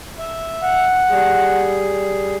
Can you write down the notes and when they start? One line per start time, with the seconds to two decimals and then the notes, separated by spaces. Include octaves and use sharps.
0.19 E5
0.63 F#5
1.10 G3 G#4